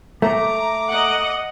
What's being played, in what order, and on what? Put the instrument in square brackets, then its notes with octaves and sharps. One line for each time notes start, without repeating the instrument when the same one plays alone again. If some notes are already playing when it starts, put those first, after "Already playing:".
[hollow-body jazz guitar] A3 [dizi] A#5 [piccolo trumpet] D6
[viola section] D#5 F#5